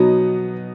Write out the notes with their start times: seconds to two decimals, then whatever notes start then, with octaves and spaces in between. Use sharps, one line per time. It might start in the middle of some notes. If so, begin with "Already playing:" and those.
Already playing: B2 F#3 B3 D#4